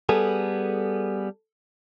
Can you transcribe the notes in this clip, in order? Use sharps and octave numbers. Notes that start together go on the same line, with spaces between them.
G3 B3 G#4 A4